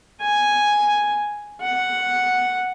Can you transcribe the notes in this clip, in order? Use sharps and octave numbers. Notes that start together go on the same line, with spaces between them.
G#5
F#5